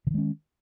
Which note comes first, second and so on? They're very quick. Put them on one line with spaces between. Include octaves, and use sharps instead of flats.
D3 D#3 G#3 C#4